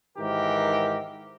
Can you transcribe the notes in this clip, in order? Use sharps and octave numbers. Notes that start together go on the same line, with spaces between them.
G#2 D#3 E3 G4 A#4